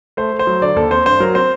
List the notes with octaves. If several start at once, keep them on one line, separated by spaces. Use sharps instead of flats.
A3 C5
A3
C5
F#3
D3 D5
D#2 A4
C4 C5
G2 C5
F#3 A#4
C4 C5